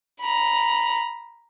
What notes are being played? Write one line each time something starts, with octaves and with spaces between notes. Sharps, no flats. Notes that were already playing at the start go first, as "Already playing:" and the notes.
A#5 B5